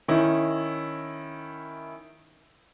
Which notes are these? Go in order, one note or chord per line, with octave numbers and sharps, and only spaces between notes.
D#3 C#4 E4